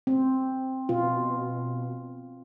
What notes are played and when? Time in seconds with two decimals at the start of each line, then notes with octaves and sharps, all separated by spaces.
0.07 C4
0.89 B2 F4